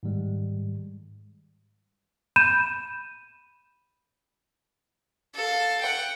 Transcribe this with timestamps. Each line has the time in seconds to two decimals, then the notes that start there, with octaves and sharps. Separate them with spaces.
0.03 G#2 D#3 G3 G#3
2.36 B5 G6 D#7 E7
5.35 A4 F5
5.81 F#5 G5